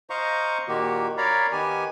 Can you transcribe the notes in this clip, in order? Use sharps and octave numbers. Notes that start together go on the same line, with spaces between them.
C5 D#5 F5 A#5 C#6
A#2 D#3 A#3 F#4 G4
A#4 C#5 D5 F5 A#5 B5
D#3 B3 G4 G#5